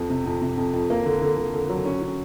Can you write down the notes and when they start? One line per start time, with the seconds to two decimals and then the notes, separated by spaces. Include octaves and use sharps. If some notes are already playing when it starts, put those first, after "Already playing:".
Already playing: F2
0.10 C3
0.26 F2
0.42 C3
0.58 F2
0.74 F2
0.90 A#3
1.06 D3
1.22 D3
1.38 D3
1.54 D3
1.70 F#3
1.85 C#4
2.02 C#4